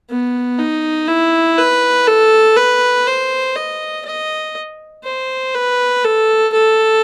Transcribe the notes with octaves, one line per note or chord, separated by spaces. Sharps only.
B3
D#4
E4
B4
A4
B4
C5
D#5
D#5
C5
B4
A4
A4